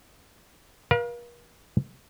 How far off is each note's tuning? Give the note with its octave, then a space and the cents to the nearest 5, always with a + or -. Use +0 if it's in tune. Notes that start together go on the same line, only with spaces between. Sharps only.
A#4 +45 F5 +0